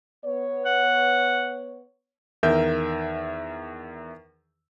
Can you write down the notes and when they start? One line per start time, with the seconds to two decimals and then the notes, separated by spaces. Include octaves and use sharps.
0.25 B3 C#5
0.65 F#5
2.43 E2 D#3 A#4 E5 G6